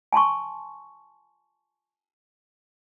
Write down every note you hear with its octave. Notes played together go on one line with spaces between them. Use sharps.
G#5 A5 C6 C#6